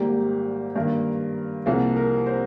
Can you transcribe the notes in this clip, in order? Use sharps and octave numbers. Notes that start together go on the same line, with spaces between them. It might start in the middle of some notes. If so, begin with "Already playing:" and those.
Already playing: G#1 G#2 G3 A#3 G4
G2 D#3 A#3 A#4
C2 C3 F3 A#3 G#4
A#4
C5